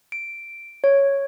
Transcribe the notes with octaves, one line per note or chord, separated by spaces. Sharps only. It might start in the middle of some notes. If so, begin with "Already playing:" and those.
D7
C#5